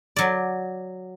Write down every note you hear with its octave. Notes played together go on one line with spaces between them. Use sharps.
F#3 D5